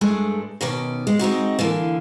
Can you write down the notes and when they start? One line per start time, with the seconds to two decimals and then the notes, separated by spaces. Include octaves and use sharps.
0.01 G2 G#3 A3 D4
0.61 B2 D#3 C#4 D5
1.07 G#3
1.19 G#3 C4 D#4 F#4
1.59 D3 E3 A#3